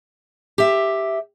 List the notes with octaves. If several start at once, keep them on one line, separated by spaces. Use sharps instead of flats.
G4 E5